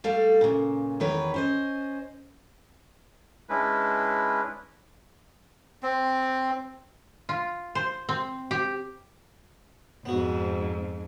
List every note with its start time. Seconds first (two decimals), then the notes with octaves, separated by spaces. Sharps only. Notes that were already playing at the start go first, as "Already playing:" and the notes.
0.04 G3 A3 A4 F5
0.41 A#2 C#3
1.00 E2 D#3 B4 C#5
1.34 C#4 C5 D#5
3.49 G#3 C#4 D4 E4 B4
5.83 C4
7.29 F4
7.75 C5
8.09 C4
8.51 G4
10.06 F2 G#2 B3 F#4